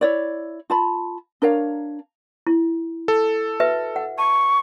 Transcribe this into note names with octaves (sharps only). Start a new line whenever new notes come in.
E4 C#5 D5
F4 A5 B5
D4 A#4 C#5 F5
E4
A4
F#4 B4 E5
F#5
A5 C#6